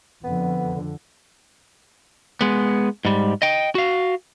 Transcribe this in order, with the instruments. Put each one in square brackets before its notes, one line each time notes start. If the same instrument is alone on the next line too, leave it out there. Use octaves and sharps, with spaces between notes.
[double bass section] F2 D3 [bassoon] B3
[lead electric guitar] G#3 B3
G#2 G3
D#5 G5
F#4 F5